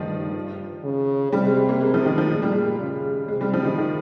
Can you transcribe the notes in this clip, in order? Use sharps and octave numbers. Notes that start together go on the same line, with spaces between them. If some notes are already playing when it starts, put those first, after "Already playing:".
Already playing: G2 D#3 F3
C#3
C3 G3
G#3
G#3
A#3
G#3
F3
D#3
F3
A#2 G#3
G3
G#3
C#3
C3 G#3
G3
F3
D#3
D#3